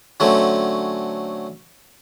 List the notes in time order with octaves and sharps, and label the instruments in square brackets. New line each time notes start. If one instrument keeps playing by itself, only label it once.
[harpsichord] D3 F#3 A3 C4 C#4